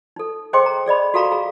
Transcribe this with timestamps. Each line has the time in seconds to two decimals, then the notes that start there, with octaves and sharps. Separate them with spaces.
0.16 D#4 A4
0.53 G#4 C5 D#5 G5 C6 D6
0.66 A#5
0.86 G#4 D5 D#5 B5
1.14 F#4 A4 F5 A#5 B5 C#6
1.32 G#4 A#5